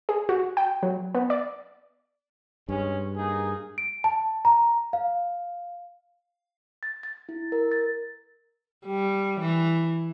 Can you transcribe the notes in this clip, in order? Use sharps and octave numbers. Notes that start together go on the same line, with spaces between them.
G#4
F#4
G5
F#3
B3
D5
G2 G#3 C#4
A#3 D#4 G#4
D7
A5
A#5
F5
A6
A6
E4
A#4
A6
G3
E3